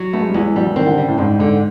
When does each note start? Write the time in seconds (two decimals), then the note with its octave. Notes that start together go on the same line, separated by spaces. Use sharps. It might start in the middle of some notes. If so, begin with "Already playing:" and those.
Already playing: F#3
0.13 A3 B3
0.20 G#3
0.29 G3
0.34 E2 G#3
0.55 F#3 G3
0.66 E3
0.76 D#3 C4
0.87 D3
0.97 C#3 G3
1.08 A2
1.18 G#2 C4
1.39 G#2 D3